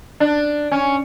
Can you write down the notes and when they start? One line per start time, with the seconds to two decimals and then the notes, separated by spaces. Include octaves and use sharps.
0.20 D4
0.71 C#4